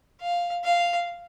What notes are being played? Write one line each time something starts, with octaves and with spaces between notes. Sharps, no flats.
F5
F5